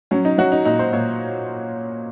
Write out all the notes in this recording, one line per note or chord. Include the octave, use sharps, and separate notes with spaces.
F#3 C#4
D#4
F#3 F#4
D#4
A#2 D#4
C5
A#2 C#5